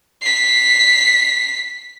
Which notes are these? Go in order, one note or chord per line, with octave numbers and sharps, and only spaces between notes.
B6 C7